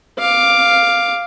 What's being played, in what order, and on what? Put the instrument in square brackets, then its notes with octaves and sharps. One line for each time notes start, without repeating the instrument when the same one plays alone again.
[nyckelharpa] F5 D6